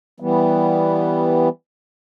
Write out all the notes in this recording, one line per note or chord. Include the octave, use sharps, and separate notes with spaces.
E3 G3 B3